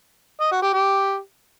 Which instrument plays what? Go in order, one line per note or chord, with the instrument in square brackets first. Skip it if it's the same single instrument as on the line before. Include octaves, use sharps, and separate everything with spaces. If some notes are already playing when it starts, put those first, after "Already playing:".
[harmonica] D#5
F#4
G4
G4